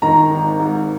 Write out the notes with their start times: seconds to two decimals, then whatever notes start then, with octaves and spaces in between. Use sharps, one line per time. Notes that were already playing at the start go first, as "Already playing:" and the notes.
0.02 D#3 A#5
0.31 G#1
0.59 G#2